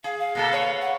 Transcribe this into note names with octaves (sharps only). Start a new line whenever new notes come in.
G#4 F5
F5
B2 A#3 A4
B4 C#5
F#5